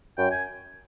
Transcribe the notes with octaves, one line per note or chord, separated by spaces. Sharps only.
F#2 G5
G#5